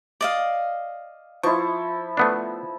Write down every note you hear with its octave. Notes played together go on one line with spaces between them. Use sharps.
D5 D#5 F5
F3 E4 C#6
A3 B3 D4